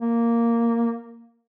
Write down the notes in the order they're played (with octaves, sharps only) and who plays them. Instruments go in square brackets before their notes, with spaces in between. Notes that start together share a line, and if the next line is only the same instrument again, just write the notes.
[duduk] A#3